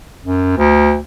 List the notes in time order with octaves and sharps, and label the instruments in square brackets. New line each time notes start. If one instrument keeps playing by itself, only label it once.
[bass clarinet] F#2
D2